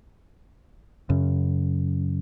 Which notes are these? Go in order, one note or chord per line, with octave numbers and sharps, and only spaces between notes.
F#2 C#3